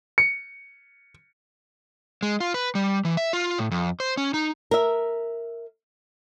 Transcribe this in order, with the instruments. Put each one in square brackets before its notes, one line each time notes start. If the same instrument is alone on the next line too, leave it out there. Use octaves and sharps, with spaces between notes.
[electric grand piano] C#7
[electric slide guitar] G#3
F4
B4
G3
E3
E5
F4
A2
F2
C5
C#4
D#4
[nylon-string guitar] A#4 E5